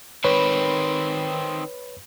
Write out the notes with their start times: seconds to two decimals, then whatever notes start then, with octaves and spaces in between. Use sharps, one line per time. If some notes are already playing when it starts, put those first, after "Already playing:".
0.24 D#3 C4 B4 C#5 B5